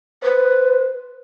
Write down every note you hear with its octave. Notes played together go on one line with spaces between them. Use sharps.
B4 C5